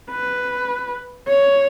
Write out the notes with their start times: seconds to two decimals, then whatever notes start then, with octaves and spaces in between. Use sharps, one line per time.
0.11 B4
1.28 C#5